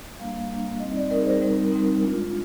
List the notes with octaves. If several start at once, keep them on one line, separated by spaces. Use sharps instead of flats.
G3 A#3 D4 F5
G3 A#3 D4
G3 C4 D#4 D#5
D5
G3 C4 D#4 A#4
G#4
C5
A#4
G3 C4 D#4
G3 C4 D#4
G#3 D4 F4